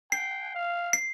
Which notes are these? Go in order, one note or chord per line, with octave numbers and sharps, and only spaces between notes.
G5 C7
F5
C7